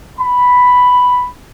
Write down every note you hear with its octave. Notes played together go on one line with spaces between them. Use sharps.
B5